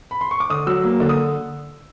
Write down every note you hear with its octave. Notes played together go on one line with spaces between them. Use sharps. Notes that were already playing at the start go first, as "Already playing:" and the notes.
B5
C6
C#6
D6
D3 D#6
F#3 E6
A#3
D3
D#6